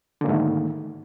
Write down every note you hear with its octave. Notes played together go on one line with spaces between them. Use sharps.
G#2 D3 D#3 A3 A#3